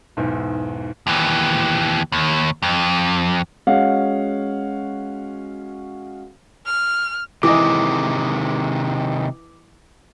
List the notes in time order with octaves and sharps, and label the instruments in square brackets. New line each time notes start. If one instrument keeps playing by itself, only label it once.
[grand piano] B1 E2 G#2
[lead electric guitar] D#2 E3
D#2
F2
[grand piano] G#3 C#4 F#4 F5 F#5
[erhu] F6
[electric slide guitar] C3 D#3 G#3 [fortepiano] E3 D#5 [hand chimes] D6